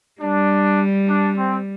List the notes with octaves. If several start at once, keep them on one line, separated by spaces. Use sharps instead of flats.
G3 D4
D4
C4